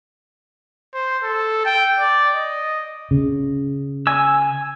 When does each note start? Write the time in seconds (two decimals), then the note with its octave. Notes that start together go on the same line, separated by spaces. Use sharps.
0.94 C5
1.23 A4
1.65 G5
1.99 D5
2.35 D#5
3.11 C#3
4.07 G#5 E6